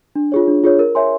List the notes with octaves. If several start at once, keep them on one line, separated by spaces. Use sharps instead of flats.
D4
F4 G#4 C#5
D4
F4 G#4 C#5
A#4
C#5 E5 G#5 C6